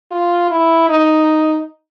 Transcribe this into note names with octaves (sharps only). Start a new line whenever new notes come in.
F4
E4
D#4